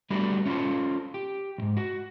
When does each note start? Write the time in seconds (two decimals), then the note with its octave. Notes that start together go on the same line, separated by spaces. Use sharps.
0.10 G3 A3 B3 D4 F#4 B4
0.46 C#4 F4 G4 A4 C5
1.14 G4
1.58 B1 G#2
1.77 F#4